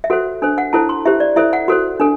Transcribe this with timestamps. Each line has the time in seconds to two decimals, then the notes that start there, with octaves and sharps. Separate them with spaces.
0.04 E5
0.10 F#4 A4 C5 F#5
0.42 D4 A4 C5
0.58 F#5
0.73 E4 A4 C5 A5
0.89 C6
1.05 E4 G4 C5 E5
1.20 D5
1.36 E4 A4 C5 E5
1.53 F#5
1.68 F#4 A4 C5
2.00 D4 A4